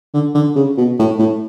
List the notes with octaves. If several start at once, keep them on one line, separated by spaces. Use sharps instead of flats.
D3
D3
C#3
B2
A2
A2